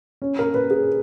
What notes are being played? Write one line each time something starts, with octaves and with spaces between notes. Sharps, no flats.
C#4
A#4
B4
G#4